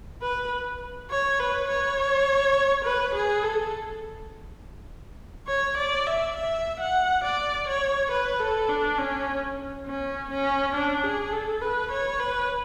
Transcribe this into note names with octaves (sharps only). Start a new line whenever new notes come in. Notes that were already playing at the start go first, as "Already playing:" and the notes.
B4
C#5
B4
C#5
B4
G#4
A4
C#5
D5
E5
E5
F#5
D5
C#5
B4
A4
D4
C#4
C#4
C#4
D4
G#4
A4
B4
C#5
B4